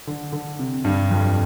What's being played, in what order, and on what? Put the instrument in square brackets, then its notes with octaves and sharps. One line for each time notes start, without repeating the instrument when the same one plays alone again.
[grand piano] D3
D3
C3
G2
F2